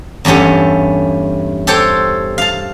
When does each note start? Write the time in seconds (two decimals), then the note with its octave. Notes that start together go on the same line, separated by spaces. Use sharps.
0.25 E2 G2 A3 C#4 G4
1.67 G4 A4 C5 C#5 G5
2.38 F5 A5